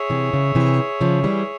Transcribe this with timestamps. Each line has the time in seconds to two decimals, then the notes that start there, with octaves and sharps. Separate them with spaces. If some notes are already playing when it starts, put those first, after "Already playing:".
Already playing: G#4 C#5 E5
0.10 C3 E3
0.33 C#3
0.55 C3 E3
1.01 C#3 F3
1.24 E3 G3